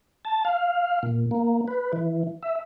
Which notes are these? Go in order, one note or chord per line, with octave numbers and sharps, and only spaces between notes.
A5
F5
A#2
A#3
B4
E3
E5